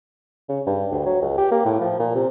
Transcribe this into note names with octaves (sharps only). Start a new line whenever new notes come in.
C#3
G2
D2
F#3
C#2
G4
A#3
A2
F3
A#2
C3